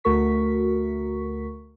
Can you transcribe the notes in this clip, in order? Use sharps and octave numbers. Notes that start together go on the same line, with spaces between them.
D2 A3 F#4 A#4 C#6 B6